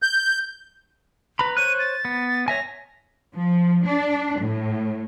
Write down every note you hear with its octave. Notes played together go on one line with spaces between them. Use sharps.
G6
B4 A#5 B5
C5 C#5 F#6 D#7
A6
B3
C#5 E5 G#5 A#6
F3
D4
A2